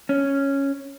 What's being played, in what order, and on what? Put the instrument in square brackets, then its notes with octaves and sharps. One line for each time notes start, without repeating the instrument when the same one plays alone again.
[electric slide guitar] C#4